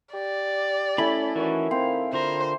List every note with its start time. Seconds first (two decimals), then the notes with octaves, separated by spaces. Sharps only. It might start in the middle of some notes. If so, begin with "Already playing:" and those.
0.14 G4 D5
0.98 A3 C#4 E4 A4 G#5 B5
1.36 D#3 E3 C#4 F#4
1.71 C4 F5
2.13 D3 F4 A#4 C5